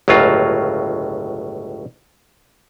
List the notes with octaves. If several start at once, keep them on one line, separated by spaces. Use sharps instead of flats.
G1 C#2 A2 F#3 F4